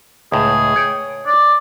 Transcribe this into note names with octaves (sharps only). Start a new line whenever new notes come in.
C#2 A2 G#4
C#5 G5
D5